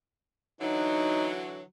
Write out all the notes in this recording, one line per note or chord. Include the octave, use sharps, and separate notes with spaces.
D3 E3 F#3 D#4